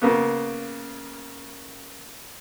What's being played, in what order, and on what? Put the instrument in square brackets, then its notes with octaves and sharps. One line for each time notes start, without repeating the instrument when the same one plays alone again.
[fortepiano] C#3 A#3 B3